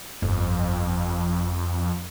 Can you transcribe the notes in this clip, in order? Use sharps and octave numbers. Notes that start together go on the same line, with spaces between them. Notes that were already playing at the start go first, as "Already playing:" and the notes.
G1 F2